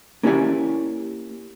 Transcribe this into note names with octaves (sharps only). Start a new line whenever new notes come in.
A#3 C#4 E4 G4 D5 G#5